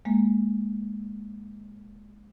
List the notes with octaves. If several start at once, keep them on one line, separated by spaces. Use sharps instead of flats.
G#3 A#3